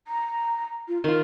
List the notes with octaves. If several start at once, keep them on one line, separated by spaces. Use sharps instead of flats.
A#5
F4
D#3 F4 A#4